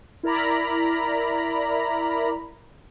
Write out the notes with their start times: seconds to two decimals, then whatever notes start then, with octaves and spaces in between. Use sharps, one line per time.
0.23 E4 A#4 D5 A#5 B5